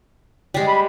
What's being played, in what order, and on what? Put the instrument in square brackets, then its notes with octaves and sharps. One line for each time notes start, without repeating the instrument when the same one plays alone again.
[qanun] G3 G#3
[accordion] B5